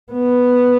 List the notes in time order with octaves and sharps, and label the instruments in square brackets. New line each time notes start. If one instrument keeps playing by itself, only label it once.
[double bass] B3